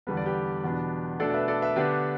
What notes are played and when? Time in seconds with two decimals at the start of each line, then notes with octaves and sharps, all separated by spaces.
0.07 E2 D3 G3 B3 B4
0.17 D5
0.26 G4 B4
0.64 E2 B2 B3 D4
1.20 B2 A3 D4 A4 D5
1.30 D5
1.34 B4 E5
1.48 A4 D5
1.62 B4 E5
1.76 D3 B3 D4 G4 B4